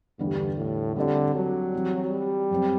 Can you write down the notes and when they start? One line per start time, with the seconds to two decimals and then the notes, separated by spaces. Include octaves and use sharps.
0.19 E2 G2 D3 G3 B3
0.57 A2
0.96 D3 G3 C4 G4 D5
1.35 F#3
1.74 E3 G3 C4
2.11 G3
2.51 F#2 F#3 C4